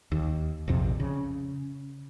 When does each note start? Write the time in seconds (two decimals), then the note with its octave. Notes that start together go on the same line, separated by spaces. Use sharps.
0.12 D#2
0.68 A#1 F2 C3
1.00 C#3